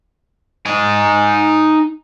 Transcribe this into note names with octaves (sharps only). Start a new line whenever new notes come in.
D#4 G#5